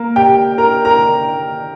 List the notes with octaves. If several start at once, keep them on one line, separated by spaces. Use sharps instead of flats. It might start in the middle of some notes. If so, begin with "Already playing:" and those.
Already playing: A#3 A#4
G4 G5
A#4 A#5
A#4 A#5